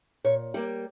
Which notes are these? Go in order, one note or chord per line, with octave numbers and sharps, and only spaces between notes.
A#2 C#5
G3 A#3 D5